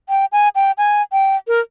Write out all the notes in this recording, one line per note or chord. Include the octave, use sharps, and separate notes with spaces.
G5
G#5
G5
G#5
G5
A#4